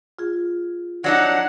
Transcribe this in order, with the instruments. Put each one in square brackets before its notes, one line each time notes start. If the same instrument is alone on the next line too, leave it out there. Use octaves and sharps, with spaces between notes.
[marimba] F4 G#4
[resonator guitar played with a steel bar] F#3 D4 D#4 [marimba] D5 [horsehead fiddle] F#5